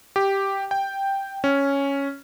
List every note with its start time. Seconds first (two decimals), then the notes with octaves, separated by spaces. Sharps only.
0.16 G4
0.71 G5
1.44 C#4